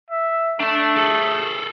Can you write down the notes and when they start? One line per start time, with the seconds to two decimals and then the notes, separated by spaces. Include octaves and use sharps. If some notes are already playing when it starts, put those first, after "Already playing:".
0.10 E5
0.60 A3 D4 A5
0.96 G#4 A4